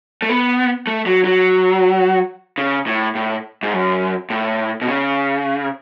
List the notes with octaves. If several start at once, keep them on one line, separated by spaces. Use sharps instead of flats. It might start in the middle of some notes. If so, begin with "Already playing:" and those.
A3
B3
A3
F#3
F#3
C#3
A2
A2
G#2
F#2
A2
B2
C#3